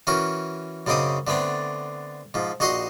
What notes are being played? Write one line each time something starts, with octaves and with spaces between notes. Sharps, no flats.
E3 C#4 F#4 A#4
F#2 C#3 C4 D#4 D6 D#6
D3 A3 B3 C4 D4
G#2 F3
A#1 D#4 F#4 D#5 C6 D#6